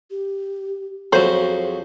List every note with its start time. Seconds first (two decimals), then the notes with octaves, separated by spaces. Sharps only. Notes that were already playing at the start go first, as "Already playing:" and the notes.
0.11 G4
1.13 F2 F#3 G#4 C5